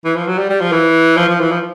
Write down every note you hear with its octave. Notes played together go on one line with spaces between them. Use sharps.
E3
F3
F#3
G3
G3
F3
E3
F3
F3
E3
F3